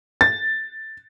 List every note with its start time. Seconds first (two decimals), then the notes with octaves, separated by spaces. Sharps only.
0.21 A6